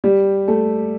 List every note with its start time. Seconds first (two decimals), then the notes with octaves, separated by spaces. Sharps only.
0.04 G3 G4
0.48 A3 A4